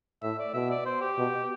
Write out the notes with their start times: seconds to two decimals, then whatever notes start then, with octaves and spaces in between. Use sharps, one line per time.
0.23 A2 E5
0.39 D5
0.54 B2 E5
0.70 D5
0.86 C5
1.01 G4
1.18 B2